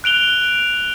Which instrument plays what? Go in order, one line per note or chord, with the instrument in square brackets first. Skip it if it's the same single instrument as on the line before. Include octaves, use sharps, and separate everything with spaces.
[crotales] F#6 D7 F7 G7